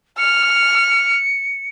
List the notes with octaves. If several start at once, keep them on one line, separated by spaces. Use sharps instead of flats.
F6 C#7